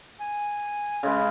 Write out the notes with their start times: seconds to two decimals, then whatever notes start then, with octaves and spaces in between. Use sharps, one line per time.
0.20 G#5
1.03 C#3 G#3 B4